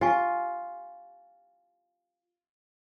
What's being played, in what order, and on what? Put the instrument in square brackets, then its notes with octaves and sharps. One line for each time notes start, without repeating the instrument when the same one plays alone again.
[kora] F4 [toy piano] G4 G#5 C#6